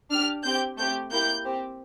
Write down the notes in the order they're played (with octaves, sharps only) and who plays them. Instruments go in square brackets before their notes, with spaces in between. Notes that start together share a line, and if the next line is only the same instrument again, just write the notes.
[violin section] D4 G4 F6
C4 G4 G6
A3 C4 G4 G6
A#3 E4 G4 G6
C4 G4